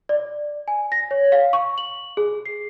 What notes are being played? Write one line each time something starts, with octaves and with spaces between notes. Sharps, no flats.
D5
G#5
A#6
C#5
F5
C#6
F#7
G#4
C7